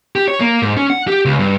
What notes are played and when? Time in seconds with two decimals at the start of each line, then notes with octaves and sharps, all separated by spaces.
0.16 G4
0.28 C#5
0.41 A#3
0.62 G#2
0.77 C#4
0.90 F#5
1.08 G4
1.25 C#2
1.39 G2